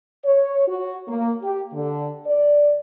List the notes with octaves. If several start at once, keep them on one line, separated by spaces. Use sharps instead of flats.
C#5
F#4
A#3
G4
D3
D5